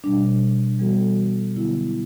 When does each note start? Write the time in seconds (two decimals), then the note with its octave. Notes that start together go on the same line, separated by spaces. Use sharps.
0.04 B2 G3 D4
0.79 E3 G3 B3 F#4 A4
1.56 D3 F#3 B3 E4